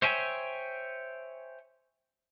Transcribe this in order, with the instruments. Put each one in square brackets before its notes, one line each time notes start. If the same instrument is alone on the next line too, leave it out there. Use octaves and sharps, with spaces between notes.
[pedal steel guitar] C5 C#5 E5 G5 G#5